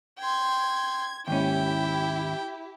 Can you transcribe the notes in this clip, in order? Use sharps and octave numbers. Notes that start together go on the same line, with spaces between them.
G5 C6 G#6
D#2 G#2 C#4 E4 G4 G5